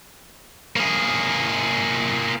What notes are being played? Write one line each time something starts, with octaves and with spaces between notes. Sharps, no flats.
A#3 G#4